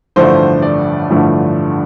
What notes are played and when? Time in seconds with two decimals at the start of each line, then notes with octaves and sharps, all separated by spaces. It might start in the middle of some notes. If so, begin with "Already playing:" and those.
0.16 A1 G2 D3 F3 A3 C5
0.62 D5
1.10 A1 G2 D3 F3 A3